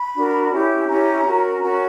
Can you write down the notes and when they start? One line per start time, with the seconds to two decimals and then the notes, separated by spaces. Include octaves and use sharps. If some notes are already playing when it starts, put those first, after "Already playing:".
Already playing: B5
0.15 D4 F#4 A#4
0.51 C#4 E4 G4
0.88 C#4 E4 G4 A#5
1.24 C#4 F#4 A#4
1.60 C#4 F#4 A#4 A#5